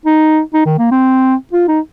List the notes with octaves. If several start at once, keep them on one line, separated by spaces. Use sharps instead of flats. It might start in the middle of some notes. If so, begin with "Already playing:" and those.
D#4
D#4
D#3
A#3
C4
F4
D#4